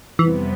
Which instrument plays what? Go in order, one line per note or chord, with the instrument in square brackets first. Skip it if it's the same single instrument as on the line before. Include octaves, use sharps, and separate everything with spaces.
[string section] F2 C3 G3 B3 [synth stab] E3